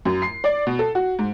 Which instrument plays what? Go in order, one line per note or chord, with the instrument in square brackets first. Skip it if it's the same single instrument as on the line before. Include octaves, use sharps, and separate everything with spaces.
[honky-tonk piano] F#2
C7
D5
B2
A4
F#4
G#2